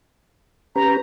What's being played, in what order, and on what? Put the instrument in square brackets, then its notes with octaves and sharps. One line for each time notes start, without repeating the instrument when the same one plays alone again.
[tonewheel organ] C#4 G4 B4 [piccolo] A#5